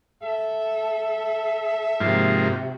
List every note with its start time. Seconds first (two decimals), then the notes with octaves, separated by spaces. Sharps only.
0.23 A4 E5
2.00 G#2 C3 F3 A#3 F#4